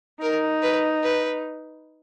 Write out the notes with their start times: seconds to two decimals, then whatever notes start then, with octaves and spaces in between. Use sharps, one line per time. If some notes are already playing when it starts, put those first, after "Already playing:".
0.21 D#4 A#4
0.62 B4
1.03 B4